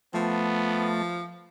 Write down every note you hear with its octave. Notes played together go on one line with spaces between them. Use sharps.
F3 A3 B3